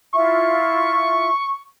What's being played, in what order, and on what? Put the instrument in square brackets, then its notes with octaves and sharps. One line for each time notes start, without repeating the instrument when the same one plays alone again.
[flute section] E4 F4 E5 [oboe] C#6